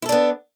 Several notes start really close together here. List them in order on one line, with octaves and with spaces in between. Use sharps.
E4 A4 D4 B3